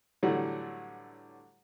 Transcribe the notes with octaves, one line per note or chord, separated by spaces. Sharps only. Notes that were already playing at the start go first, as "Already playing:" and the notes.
A2 D3 E3 F#3 G3 A3